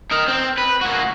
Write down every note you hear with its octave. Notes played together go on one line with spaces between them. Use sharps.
D#4 A#4
C4
B4
A#3 F#4